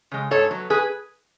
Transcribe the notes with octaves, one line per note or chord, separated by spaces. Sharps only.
C#3 G#3
G#2 A4 C#5
F#3 B3
G#4 B4